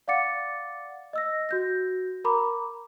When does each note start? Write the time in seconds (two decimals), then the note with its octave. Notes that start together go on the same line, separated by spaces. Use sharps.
0.08 D5 F5 F#5 D6 A6 C#7
1.13 D#5 E6 A#6
1.49 F#4 G6 A#6
2.24 A#4 A#5 B5 D6